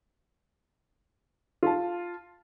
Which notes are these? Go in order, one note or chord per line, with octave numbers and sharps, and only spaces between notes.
F4 A5